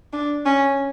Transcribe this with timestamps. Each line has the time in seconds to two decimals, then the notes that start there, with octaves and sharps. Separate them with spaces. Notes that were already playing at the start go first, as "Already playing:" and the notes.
0.13 D4
0.46 C#4